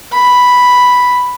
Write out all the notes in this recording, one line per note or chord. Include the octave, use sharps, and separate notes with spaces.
B5